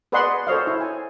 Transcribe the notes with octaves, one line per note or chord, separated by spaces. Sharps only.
G#4 B4 D5 D#5 F#5 C6
A4 C5 C#5 D#5 F5
E4
G#5